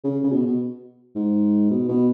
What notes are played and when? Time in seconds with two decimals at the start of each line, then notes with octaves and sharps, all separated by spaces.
0.04 C#3
0.24 C#3
0.33 B2
0.46 B2
1.15 G#2
1.71 B2
1.88 B2